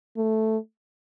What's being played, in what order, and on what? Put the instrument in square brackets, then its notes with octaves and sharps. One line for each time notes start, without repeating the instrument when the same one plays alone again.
[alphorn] A3